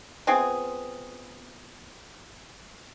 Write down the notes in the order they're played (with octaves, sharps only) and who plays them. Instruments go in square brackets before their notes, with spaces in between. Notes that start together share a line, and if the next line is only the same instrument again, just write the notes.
[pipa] B3 C4 F4 G#4